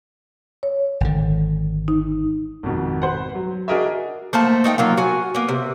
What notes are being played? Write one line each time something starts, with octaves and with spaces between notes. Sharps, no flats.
C#5
G#1 D3
D#4
G#1 F2 B2 D#3
B4 C5 F#5
F#3
D4 F#4 G#4 A#4 D#5 E5
A3 A#3 C5 A5
A3 D#4 F#5 G5
F#3 A#3 F4
F#4 G#5
A#3 B3
C3